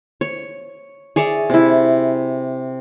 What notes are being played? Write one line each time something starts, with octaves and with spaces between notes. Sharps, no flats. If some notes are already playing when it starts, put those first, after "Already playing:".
C#5
G#4 C#5 D5 E5
C3 E4